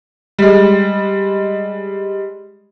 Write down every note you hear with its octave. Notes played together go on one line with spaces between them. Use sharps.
G3 G#3